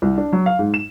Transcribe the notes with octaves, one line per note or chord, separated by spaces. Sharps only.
C2
D4
F#3
F5
G#2
E7